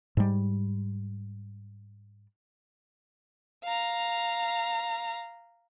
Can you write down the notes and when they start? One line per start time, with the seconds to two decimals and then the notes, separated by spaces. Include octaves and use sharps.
0.17 G#2 G3
3.64 F5 A#5